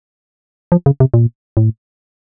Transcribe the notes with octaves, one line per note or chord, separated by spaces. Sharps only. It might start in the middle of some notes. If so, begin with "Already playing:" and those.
F3
C#3
C3
A#2
A2